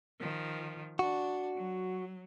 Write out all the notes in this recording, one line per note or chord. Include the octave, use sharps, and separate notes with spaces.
D#3 F3
D4 F#4
F#3